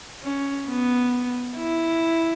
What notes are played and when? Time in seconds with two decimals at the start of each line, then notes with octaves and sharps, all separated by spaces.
0.22 C#4
0.68 B3
1.57 E4